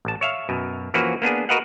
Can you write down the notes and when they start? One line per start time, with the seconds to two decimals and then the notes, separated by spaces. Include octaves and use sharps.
0.05 A1 A5
0.21 C#5 E5 F5
0.49 F#2 B2
0.94 E3 F3 A#3 C#4 F#4 B4
1.22 A#3 B3 D4 G#4
1.49 F#4 A#4 B4 D#5 F5 F#5